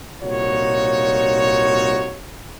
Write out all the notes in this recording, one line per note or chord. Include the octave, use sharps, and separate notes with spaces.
C2 A#2 D#4 F4 F#4 C#5